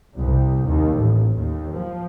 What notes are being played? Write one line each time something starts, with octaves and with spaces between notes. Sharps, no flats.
C2
D#2
A1
D#2
F3